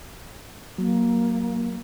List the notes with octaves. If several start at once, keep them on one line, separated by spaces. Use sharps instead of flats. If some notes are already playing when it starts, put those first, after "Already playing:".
F#3 A#3